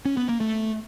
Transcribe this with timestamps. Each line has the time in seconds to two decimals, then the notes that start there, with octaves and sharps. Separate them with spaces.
0.05 C#4
0.17 B3
0.29 A#3
0.40 A3